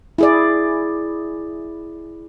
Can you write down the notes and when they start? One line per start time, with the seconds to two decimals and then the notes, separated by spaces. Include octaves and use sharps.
0.18 E4 G#4 D5